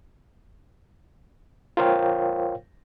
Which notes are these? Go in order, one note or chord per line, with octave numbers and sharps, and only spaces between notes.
F4 A#4 C5 C#5 F5 G5